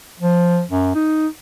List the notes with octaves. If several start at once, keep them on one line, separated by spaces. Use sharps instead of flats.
F3
F#2
D#4